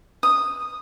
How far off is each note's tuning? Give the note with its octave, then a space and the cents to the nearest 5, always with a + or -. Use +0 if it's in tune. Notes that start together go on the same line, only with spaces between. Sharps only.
D#6 -5